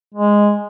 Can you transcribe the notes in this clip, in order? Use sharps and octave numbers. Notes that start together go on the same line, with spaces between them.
G#3